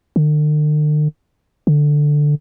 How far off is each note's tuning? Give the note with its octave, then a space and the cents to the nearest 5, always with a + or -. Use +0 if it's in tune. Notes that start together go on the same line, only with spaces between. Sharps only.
D3 +45
D3 +5